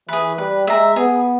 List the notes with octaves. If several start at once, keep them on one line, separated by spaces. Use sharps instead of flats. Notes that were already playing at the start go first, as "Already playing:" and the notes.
E3 G#4 B4
G3 B4
G#3 E5 A#5
B3 G#4